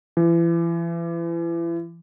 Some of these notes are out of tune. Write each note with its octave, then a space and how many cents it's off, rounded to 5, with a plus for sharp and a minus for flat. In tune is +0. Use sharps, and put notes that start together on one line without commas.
E3 +35